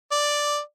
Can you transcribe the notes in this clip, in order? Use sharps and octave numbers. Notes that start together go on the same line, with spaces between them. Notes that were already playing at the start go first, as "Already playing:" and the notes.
D5